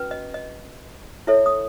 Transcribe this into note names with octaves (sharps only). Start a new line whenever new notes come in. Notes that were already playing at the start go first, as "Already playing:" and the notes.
Already playing: C#4 F#4 B4
D#5
D#5
E4 A4 C#5 E5
D#6